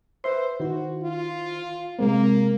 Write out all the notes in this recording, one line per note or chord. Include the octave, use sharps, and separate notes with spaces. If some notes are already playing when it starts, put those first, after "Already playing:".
B4 C5 E5 C6
D#3 E4 F#4 C5
F4
C3 G#3 A#3 C4